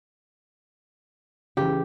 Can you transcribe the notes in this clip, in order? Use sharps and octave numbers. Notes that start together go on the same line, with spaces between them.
C#3 E3 G4